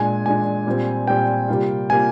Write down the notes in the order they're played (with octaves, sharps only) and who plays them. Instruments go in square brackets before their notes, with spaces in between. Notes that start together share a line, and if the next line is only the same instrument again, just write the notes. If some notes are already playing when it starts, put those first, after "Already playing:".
Already playing: [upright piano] A#2 G#3 D4 [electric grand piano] G#5
[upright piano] A#2 G#3 D4 [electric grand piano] G#5
[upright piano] A#2 G3 C4
[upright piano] A#2 G3 C4 [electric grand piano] G5
[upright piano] C3 G3 A#3 F4
[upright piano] C3 G3 A#3 F4 [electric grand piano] G#5